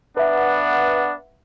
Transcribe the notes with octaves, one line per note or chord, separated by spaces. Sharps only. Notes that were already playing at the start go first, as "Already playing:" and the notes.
B3 D4 B4 E5 F#5